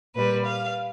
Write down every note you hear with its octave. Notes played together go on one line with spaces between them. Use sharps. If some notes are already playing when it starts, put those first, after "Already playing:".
A#2 G3 B4
F5